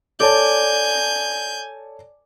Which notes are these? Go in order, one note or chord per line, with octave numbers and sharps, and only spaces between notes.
A4 C#5 D5 G#5 A5 G6